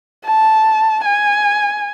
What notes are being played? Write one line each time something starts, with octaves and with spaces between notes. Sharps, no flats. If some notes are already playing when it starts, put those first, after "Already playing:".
A5
G#5